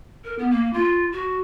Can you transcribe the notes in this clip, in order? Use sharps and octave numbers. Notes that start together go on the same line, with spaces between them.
A#4
B3
A#3
F4
F#4